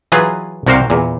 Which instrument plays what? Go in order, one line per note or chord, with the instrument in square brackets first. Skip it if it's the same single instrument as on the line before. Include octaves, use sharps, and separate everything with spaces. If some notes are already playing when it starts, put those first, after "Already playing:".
[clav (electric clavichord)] E3 F#3 F4 G#4 B4
C2 C3 F#4 A#4 C5 F5
E2 A#2